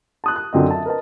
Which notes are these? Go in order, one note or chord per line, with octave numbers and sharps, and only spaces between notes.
A5 D#6 F#6
F#6
F#2 D3 C4 D#5
E5 A5
A#4 B4 D#5 A5